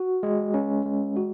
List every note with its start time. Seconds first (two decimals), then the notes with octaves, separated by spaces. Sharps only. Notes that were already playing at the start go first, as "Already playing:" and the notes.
Already playing: F#4
0.23 G#3
0.54 C#4
0.86 G#3
1.17 F#4